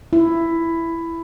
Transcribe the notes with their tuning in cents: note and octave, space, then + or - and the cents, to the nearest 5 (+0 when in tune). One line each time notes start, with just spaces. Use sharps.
E4 +10